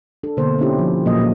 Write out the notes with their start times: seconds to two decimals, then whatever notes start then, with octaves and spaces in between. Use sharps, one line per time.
0.23 D4 A4
0.37 B2 D3 A#3 C5
0.59 C#4 D4 E4 G4
0.78 F3
1.06 A#2 F#3 A#3 F4 D#5
1.18 A#2 A#3